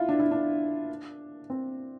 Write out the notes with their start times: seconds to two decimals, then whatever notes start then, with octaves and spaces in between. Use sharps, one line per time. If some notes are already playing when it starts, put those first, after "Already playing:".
Already playing: E4 F4
0.09 D4
0.20 E4
0.31 D4
1.50 C4